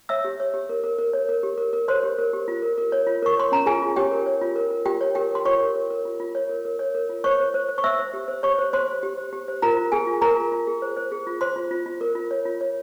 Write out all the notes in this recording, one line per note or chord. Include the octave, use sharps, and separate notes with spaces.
C#5 E5 E6
G4
C#5
G4
A#4
A#4
A#4
C#5
A#4
G4
A#4
A#4
C5 C#5 C6
G4
A#4
G4
F4
A#4
A#4
C#5
F4
A#4 C#6
C#5 C6
C#4 A#5
F4 G#4 G#5
F4
G4 C#5 G5
A#4
C#5
F4
A#4
A#4
F4 G4 G5
C#5
G4 A#4 G5
A#4 C6
F4 C#5 C#6
A#4
A#4
A#4
F4
F4
C#5
A#4
A#4
C#5
A#4
F4
C5 C#5 C#6
C5
C5
C5
C#6
C5 E5 E6
C5
G4
C5
G4 C#5 C#6
C5
C5 C6
C5
G4
C5
G4
C5
F4 A#4 A#5
F4
G#4 G#5
F4
G#4 A#4 A#5
F4
F4
G#4
C5
C5
G#4
F4
C5 C6
F4
F4
F4
A#4
F4
C#5
F4
C#5